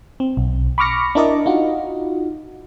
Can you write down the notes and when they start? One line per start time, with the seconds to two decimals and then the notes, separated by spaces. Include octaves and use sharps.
0.20 C4
0.37 B1
0.78 B5 C#6 D6 F6 A#6 C#7
1.15 D4 E4 A#4 D5 D#5
1.46 D#4 F4 F#4